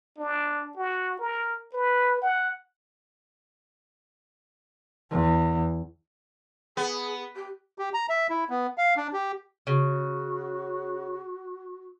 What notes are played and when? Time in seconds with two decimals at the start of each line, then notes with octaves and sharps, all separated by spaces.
0.18 D4
0.77 F#4
1.19 A#4
1.73 B4
2.22 F#5
5.11 E2
6.77 B3 G#4
7.35 G4
7.79 G4
7.94 A#5
8.09 E5
8.30 E4
8.49 B3
8.78 F5
8.97 D4
9.13 G4
9.67 C#3 F#4